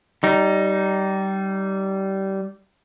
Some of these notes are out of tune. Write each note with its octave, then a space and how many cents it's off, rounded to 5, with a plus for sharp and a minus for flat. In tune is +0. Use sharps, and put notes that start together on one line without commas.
G3 -20 D#4 +0